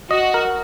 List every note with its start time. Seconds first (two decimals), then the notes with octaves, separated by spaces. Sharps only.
0.10 F#4 D#5
0.34 A#4